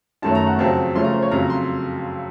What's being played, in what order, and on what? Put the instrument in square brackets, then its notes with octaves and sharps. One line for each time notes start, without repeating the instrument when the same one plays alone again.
[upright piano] F#2 D#3 F#3 A3 C#4 A5
A#5
F#5
F2 C#3 F#3 C4 A5
C#3 F3 A3 C#4 C6
A#5
C5
C#5
F2 C#3 F#3 A#5
C6